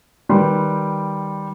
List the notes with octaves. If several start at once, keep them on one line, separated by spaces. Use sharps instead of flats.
D#3 G3 B4 G5 C6